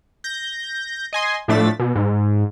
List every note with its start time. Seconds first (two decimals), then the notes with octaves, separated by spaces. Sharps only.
0.24 G6 A#6
1.13 D#5 G#5 C6
1.48 A2 F3 A3 D4 A6 B6
1.79 B2
1.95 G#2